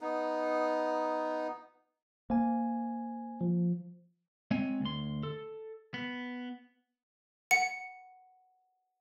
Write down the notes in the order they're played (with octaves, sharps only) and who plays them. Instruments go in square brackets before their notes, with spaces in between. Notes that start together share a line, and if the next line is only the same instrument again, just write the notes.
[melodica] B3 D#4
[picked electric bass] A#3 [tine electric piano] C5 G#5
[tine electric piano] F3
[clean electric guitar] G#3 C4 C#5 G#5
D2 C6
A4
B3
[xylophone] F#5 C#7